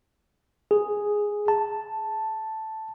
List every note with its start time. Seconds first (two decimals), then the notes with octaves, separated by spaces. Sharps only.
0.71 G#4
1.48 A5